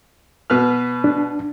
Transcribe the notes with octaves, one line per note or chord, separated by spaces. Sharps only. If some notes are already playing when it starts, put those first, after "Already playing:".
B2 B4 F6
D4